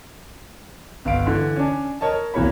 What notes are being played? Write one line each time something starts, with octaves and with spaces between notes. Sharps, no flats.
G1 F5 D7
D3 E3
C#4 D4
A#4 C#5 D#5 A5
D1 E2 E3 A#3 C#5 B5